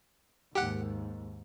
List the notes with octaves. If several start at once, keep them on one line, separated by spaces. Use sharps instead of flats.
D#2 G#2 G4 F#5